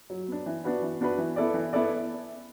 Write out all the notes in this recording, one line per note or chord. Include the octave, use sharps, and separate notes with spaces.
F#3
B3 D4
E3
B3 D4 F#4 B4
E3
B3 D4 F#4 B4
E3
B3 E4 A4 D5
E3
B3 E4 A4 D5